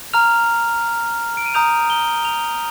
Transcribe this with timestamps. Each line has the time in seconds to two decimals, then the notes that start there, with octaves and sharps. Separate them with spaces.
0.13 A#5 F6 F7
1.37 D7
1.46 D#7
1.54 A#5 D#6 G6 F7
1.90 G7
2.18 G7
2.25 F7